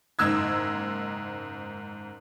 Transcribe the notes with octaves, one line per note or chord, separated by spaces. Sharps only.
F#1 G#2 D#3 E6 G#6